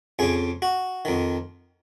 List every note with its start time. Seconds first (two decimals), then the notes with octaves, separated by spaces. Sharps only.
0.19 F2 C#3 G#4
0.62 F#4
1.05 F2 D#3